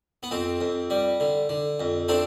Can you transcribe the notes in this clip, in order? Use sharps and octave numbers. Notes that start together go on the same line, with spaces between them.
B3
F2 C4
F2
G3
D3
D3
F2
A3 C4 D4